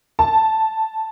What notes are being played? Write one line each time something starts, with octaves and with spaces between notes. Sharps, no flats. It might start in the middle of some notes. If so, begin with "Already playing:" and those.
A5